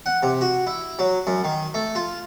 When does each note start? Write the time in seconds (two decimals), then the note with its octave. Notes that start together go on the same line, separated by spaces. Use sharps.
0.06 F#5
0.23 C3
0.41 F#4
0.67 E4
0.99 F#3
1.27 F#2
1.44 D#3
1.74 A3
1.95 F4